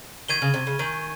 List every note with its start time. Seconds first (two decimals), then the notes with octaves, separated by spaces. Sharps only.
0.29 D#3 C#6 G#6 D#7 G7
0.42 C#3
0.54 C3
0.67 C#3
0.79 D#3 G#5 C#6 G#6 D#7